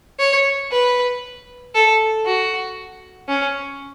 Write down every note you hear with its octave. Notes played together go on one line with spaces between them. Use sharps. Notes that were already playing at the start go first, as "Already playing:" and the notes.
C#5
B4
A4
F#4
C#4